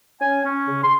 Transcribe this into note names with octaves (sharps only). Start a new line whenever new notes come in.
C#4 G#5
C#4
C#3
C6